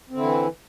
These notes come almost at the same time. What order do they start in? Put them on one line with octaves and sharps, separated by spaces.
C4 D3 E4 E3